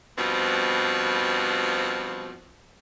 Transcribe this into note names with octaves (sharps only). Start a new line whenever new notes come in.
G2 B2 F3 C4